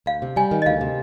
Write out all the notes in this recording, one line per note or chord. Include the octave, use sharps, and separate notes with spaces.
D2 F5
C3
G3 G#5
D#3
D#5
D2 F5
C3